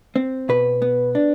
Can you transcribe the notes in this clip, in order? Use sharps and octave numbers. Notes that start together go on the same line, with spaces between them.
C4
B2 B4
B3
D4